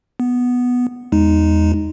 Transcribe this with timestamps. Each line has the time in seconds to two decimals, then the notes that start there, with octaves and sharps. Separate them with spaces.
0.20 B3
1.12 E2 G#3 D#4